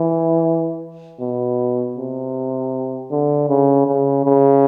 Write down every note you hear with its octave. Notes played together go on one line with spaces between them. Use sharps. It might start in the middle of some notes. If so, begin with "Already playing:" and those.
Already playing: E3
B2
C3
D3
C#3
C#3
C#3